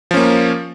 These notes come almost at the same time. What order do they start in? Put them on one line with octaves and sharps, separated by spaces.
F3 C#4 A#3